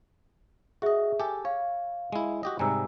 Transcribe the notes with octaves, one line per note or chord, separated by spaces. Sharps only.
F#4 G#4 D#5 E5
G4 A4 G#5
C#5 F5
G#3 E4
F#4 G4 D#5
G#2 C3 G3 G#5 A#5 E6